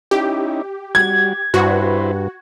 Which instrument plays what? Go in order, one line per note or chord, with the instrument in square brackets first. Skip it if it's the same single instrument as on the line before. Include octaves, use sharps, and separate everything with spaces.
[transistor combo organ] C#4 D#4 E4 [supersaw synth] G4
[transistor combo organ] G3 F#4 [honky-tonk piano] G#6
[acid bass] G2 [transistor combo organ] E4 B4 C5 [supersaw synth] F#4